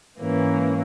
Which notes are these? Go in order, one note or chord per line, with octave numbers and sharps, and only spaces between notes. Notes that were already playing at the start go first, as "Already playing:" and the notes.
G#2 E3 A#3 C#4